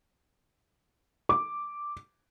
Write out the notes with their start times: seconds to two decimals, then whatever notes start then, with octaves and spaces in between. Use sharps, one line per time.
1.29 D6